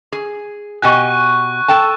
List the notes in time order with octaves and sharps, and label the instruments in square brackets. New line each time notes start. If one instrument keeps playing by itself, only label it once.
[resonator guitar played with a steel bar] G#4
[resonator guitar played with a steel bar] B2 G4 G#5 [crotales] C#6 F#6
[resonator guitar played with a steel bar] A4 G5 A5